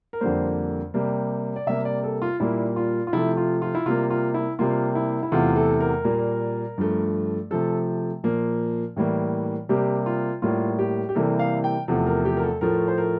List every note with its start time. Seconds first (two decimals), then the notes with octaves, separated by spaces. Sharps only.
0.13 A#4
0.21 F2 D3 G3 A#3 C5
0.94 C3 G3 A#3
1.56 D5
1.67 C3 G3 A#3 E5
1.85 D5
2.04 A4
2.22 F4
2.40 A#2 G3 A#3 E4
2.76 F4
3.07 F4
3.13 C3 F3 A3 E4
3.37 F4
3.62 F4
3.75 E4
3.86 C3 G3 A#3 F4
4.10 F4
4.34 E4
4.59 C3 G3 A#3 F4
4.95 E4
5.23 E4
5.32 E2 C3 E3 A3 F4
5.56 A4
5.80 A#4
6.04 A#2 G3 A#3
6.78 G2 F3 A3
7.51 C3 F3 A3 A4
8.24 A#2 F3 A#3
8.96 A2 E3 G3 A#3
9.69 C3 G3 A#3 G4
10.06 F4
10.42 A2 G3 A#3 F4
10.79 G4
11.09 G4
11.15 C3 E3 G3 A#3 A4
11.39 F5
11.64 G5
11.88 E2 C3 F3 A3
12.07 A#4
12.25 G4
12.37 A#4
12.43 A4
12.61 A2 F3 A3 A#4
12.88 C5
12.98 A#4